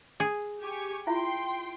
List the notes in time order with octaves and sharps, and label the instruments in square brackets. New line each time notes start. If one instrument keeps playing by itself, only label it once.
[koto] G#4
[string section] G4 G#5 C#6
[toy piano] E4 F4 E5 [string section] G5 C6